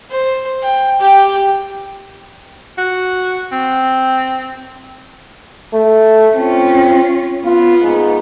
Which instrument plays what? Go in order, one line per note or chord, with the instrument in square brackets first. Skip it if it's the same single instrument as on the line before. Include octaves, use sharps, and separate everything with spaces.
[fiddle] C5
G5
G4 G5
[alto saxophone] F#4
C4
[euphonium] A3
[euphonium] C4 [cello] C#4 F4
[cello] B3 [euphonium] F4
[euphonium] G#2